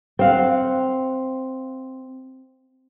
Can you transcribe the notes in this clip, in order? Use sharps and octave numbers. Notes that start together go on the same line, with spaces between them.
C4 F5 F#5